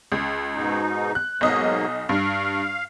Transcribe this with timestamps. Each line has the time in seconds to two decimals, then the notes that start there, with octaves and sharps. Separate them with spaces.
0.12 C#2
0.55 G#2 B2 D#4
1.15 F#6
1.41 B1 G#2 F#3 A#3 D#5 D#6
2.09 G2 F5